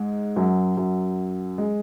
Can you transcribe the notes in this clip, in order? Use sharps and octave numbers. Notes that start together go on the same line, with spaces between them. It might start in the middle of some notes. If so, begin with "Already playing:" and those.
Already playing: G#2 G#3
F#2 F#3
F#2 F#3
G#3